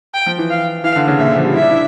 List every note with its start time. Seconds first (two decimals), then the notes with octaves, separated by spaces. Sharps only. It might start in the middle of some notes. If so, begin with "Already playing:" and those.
0.14 G5
0.26 F3
0.38 E3
0.50 F5
0.84 E3 F5
0.96 D3
1.08 C#3
1.19 A#2 E5
1.27 D3
1.36 F3
1.45 G3
1.54 E4 E5
1.62 D4
1.70 E4